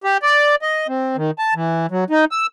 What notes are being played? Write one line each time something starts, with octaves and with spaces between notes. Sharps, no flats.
G4
D5
D#5
C4
D#3
A5
E3
F#3
D#4
E6